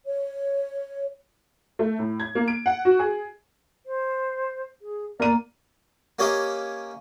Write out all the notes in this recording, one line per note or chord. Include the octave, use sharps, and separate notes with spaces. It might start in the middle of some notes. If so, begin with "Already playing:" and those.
C#5
A3
A2
G#6
A#3
D7
F#5
F#4
G#4
C5
G#4
A#3 D5 D#7
A#3 C#4 G4 C#5 D#5 F5